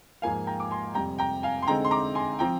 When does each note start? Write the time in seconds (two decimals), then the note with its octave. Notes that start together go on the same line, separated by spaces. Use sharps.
0.22 G#2 F3 A#3 F5 G#5
0.47 G5 A#5
0.60 D6
0.71 G#5 C6
0.94 F2 C3 G3 G5 A#5
1.19 G5 A#5
1.43 F5 G#5
1.62 C6
1.67 D3 G#3 C4 D#4 G5 A#5
1.85 C6
1.91 A#5 D6
2.15 G#5 C6
2.39 F3 C4 G5 A#5